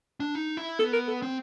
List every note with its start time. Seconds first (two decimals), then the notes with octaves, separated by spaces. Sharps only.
0.20 D4
0.35 D#4
0.57 E4
0.79 B3 A4
0.93 A#4
1.08 A4
1.22 C4